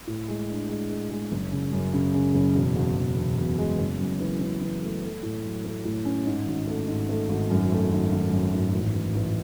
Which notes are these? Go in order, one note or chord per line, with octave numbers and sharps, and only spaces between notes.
A2
G#3
D4
G#3
G#3
G#3
F#1
C#3
F#2
C#3
C#3
F#1
E1
E1
E1
E1
E1
G#3
F#1
F#2
E3
E3
E3
A3
A3
A2
F#3
A3
A2
C#4
G#2
G#1
A3
G#2
A3
G#1
F#2
A3
G#1
G#1
F#2
G#1
A1
A1
A1